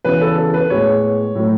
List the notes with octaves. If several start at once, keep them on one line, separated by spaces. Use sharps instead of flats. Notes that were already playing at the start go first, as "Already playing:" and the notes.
C#3 E3 B3 B4
A4
A4
A4
B4
A2 G#3 B3 C#5
A2 F#3 A3